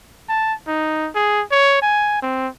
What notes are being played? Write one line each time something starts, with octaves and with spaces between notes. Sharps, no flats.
A5
D#4
G#4
C#5
G#5
C4